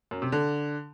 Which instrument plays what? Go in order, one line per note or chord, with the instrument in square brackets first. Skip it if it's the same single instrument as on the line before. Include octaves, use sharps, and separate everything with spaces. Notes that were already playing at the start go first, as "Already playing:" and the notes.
[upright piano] F#2
C3
D3